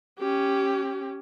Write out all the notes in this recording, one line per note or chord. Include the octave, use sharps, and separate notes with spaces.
C#4 G4